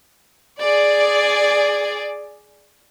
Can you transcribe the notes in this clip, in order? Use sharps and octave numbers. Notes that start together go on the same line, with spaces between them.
G#4 D5